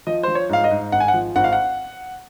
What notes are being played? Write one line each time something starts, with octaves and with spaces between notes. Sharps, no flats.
F3 D#5
F3 C5
C#5
G#2 F5
D#5
G#2
G#1 F#5
G#5
F#5
F3
G#1 F#5
F5
F#5